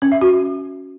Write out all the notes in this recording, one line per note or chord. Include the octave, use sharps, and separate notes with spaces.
C#4
E5
F#4